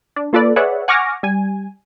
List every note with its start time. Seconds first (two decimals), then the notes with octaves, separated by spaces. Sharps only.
0.16 D4
0.33 A#3 F4 A4 B4 D5
0.56 G#4 B4 C#5 D5 E5 F#5
0.88 F#5 G#5 C#6 D6 F6 A#6
1.23 G3 G#5